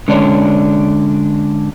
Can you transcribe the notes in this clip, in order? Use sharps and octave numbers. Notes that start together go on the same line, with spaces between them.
D3 G#3 C#4 D4 C#5 D5